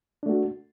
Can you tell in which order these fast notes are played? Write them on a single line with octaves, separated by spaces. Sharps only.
D4 A3 F#4